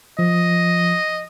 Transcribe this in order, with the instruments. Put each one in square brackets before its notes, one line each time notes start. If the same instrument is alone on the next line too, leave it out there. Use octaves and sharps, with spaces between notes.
[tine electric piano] F3 [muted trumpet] D#5